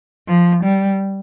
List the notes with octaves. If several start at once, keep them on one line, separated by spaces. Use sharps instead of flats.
F3
G3